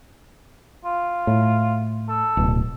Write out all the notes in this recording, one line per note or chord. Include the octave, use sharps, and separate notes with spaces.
F4
A2
A4
D1 B2